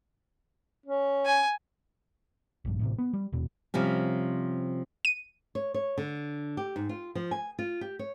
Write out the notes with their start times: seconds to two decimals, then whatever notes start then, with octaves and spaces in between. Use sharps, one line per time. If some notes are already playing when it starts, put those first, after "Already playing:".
0.86 C#4
1.26 G#5
2.65 A#1 G2
2.79 A1 A2 C3
2.98 B3
3.13 G3
3.33 D#1 E2 B2
3.74 C3 F3 G3 C#4
5.05 D#7
5.55 C#5
5.74 C#5
5.98 D3
6.57 G4
6.76 G#2
6.89 F4
7.15 F3
7.31 G#5
7.59 F4
7.81 G4
7.99 C#5